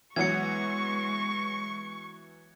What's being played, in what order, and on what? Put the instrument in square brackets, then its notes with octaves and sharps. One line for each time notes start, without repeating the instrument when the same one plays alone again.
[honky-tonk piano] E3 F#3 B3 [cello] G#3 [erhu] C#6 [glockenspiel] G#6 C#7